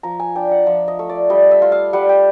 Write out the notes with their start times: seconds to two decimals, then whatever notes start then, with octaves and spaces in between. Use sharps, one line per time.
0.03 F3 A#5
0.20 G#5
0.35 D4 G5
0.51 F#5
0.67 F3 E5
0.88 D#5
0.99 A3
1.09 D5
1.29 G3 D#5
1.51 E5
1.62 F4
1.72 F5
1.93 G3 F#5
2.09 G5